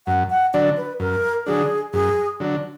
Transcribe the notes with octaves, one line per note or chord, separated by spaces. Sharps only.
F#2 F#5
F#5
D3 F#3 D4 D5
B4
F#2 A#4
D3 F#3 D4 G#4
F#2 G#4
D3 F#3 D4